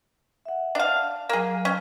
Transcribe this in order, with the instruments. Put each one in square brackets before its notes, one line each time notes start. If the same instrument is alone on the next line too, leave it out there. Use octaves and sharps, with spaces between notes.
[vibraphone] E5 F#5
[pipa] D4 F5
[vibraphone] F#3 F5 [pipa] A#3 G#4
[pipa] C#4